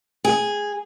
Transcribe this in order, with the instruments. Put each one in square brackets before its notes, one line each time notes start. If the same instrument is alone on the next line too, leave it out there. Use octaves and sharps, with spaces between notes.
[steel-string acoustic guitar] G#4